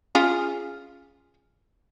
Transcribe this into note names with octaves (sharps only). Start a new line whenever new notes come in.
C#4 F4 G#4